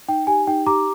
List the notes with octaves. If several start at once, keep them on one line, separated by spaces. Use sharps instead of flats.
D#4 G5
G4 G#5
D#4 G5
G4 A#5 D6